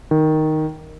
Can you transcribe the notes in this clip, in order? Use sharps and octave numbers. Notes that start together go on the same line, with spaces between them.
D#3